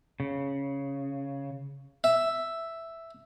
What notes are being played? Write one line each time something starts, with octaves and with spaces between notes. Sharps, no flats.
C#3
E5